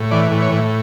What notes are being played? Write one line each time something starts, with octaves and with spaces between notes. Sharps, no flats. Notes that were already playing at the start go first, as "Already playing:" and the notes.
Already playing: A2
E3 D5
A2
C#5
A2